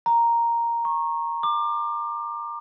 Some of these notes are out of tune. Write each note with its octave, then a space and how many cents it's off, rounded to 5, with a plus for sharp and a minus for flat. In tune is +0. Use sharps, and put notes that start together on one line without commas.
A#5 +0
C#6 -20
D6 +30